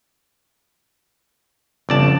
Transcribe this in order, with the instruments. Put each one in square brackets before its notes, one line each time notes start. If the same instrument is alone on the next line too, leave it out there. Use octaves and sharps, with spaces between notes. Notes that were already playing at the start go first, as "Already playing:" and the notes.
[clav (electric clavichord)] G1 D5 A5 [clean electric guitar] F2 C#3